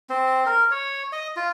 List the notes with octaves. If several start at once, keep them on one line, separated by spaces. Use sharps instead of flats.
C4
A#4
C#5
D#5
F4